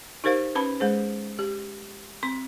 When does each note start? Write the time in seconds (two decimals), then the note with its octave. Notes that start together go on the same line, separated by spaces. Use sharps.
0.24 D#4 G4 A#4 C5 F5
0.55 C#4 B4 A5 B5
0.80 G#3 G#4 C5
1.39 G4
2.23 C4 C6